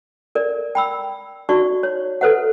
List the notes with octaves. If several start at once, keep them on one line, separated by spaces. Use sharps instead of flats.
A#4 D5
G5 B5 E6
D#4 F#4 D5 C#6
C#5
A4 B4 C5 E5 F#5